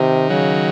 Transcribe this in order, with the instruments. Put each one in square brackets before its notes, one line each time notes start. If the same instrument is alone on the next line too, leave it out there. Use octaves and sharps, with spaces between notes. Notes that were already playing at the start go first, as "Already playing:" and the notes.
Already playing: [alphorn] C3 [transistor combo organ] D#3
[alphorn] C#3 [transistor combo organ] F#3